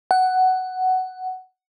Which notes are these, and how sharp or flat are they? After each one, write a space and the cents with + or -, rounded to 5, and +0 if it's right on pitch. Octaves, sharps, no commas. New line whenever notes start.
F#5 +10